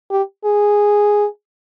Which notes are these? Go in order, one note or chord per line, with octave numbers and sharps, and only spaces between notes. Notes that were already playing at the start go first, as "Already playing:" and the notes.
G4
G#4